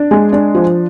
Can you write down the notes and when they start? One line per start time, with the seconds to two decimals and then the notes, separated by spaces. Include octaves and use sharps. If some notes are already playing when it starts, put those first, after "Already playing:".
Already playing: D4
0.11 G#3
0.33 D4
0.55 F3